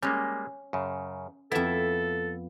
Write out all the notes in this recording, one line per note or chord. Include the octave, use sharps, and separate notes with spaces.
G3 G#3 A#3 C#4
F#2 C#3
F2 B3 E4 A4 E5